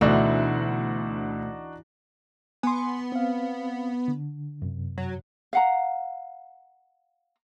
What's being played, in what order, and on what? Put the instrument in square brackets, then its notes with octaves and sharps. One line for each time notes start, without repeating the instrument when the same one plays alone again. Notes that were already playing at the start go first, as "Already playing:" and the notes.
[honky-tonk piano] D2 [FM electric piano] B2 A3 [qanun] E3 [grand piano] D4 D#4 F#4
[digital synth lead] B3 [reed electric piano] G#5 C6
[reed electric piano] C4 F5
D3
F#2 C3
[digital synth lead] F#3
[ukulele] F5 F#5 A#5